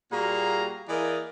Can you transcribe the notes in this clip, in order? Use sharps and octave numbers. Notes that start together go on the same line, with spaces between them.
A#2 G3 F#4 G#4 F5 A#5
E3 A#3 G#4 A#4 D5 D#5